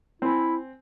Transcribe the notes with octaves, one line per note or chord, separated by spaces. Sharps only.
C4 E4 G#5